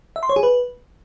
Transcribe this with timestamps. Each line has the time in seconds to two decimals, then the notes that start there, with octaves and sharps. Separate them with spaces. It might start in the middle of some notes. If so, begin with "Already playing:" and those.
0.16 E5
0.23 C6
0.29 C#5
0.36 G#4
0.43 B4